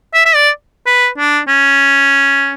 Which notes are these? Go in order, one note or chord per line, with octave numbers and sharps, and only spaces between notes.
E5
E5
D5
B4
D4
C#4